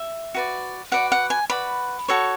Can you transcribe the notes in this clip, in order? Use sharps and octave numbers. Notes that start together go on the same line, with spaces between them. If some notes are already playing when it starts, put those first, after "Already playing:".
Already playing: E5
F#4 B4 D5
F#4 B4 D5 F#5
F#5
G#5
F#4 B4 D5 B5
F#4 A4 C#5